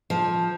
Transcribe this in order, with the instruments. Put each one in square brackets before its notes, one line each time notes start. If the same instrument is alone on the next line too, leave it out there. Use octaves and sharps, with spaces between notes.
[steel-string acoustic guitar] F3